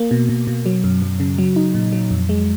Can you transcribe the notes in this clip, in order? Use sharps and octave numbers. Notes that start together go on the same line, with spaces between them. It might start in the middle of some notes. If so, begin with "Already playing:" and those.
Already playing: A#3
B2
B2
B2
F#3
F#2
F#2
C#3
F#3
D#4
A#2
F#3
F2
G#3